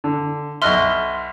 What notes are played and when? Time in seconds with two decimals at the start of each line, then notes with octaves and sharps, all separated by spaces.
0.04 D3
0.62 B1 D#5 E5 C6 F6 F#6